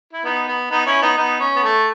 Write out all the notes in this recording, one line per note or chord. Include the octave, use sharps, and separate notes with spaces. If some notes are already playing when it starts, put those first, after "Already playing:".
E4
B3 D#4
B3
B3 D#4
C#4 E4
B3 D#4
B3 D#4
C#4
B3
A3